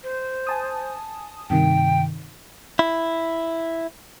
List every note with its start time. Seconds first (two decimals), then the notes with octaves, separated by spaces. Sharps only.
0.04 C5
0.47 G#5 A5 D#6
1.50 G2 C3 D#3 G5
2.79 E4